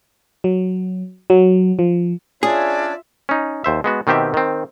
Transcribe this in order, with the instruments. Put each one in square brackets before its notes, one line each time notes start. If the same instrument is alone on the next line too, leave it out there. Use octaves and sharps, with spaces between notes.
[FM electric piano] F#3
F#3
F3
[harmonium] C#4 D4 C#5 [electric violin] F4 E5 [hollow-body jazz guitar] G#4 [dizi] D5
[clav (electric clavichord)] C#4 D#4
D#2 C5 E5
G#3 B3 F#4
B2 D#3 C4 G4 E5
D#3 C4